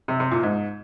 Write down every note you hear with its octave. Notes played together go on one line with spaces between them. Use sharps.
C3
C3
A#2
G#2